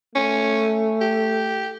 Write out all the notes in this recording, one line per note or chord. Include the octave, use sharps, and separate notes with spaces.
A3 C#4
G4